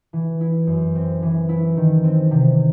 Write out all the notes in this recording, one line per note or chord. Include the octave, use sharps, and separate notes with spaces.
E3
E4
F#2
C4
E3
E4
D#3
C4
C3